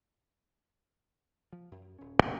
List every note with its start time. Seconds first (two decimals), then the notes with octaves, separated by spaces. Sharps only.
1.53 F3
1.71 F#2
1.99 D#1 C#4
2.22 C#2 A2 C3 D#3